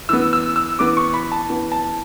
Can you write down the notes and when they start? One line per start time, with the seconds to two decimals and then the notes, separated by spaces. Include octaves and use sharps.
0.09 E3 B3 E6
0.33 E6
0.56 E6
0.79 E3 B3 D6
0.97 C#6
1.14 B5
1.32 A5
1.49 E3 B3
1.72 A5